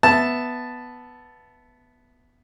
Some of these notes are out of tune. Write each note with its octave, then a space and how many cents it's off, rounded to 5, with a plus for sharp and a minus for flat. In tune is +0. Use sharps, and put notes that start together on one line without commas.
B3 +0 E5 +0 A5 +0